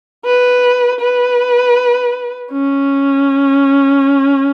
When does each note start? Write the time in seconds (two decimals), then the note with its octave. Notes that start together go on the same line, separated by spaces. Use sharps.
0.25 B4
1.00 B4
2.52 C#4